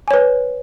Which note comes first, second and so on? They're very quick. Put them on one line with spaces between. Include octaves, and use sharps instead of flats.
G#5 C#5 B4